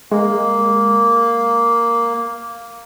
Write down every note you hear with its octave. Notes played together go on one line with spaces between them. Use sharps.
G#3 A#3